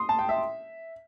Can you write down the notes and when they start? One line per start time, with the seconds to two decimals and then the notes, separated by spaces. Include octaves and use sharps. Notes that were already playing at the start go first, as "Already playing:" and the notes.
Already playing: C6 D#6
0.09 A5
0.19 G5
0.29 E5